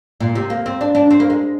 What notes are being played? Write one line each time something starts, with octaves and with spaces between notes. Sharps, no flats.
A#2
C3
A#3
C4
D4
D4
C4
A#3
G#3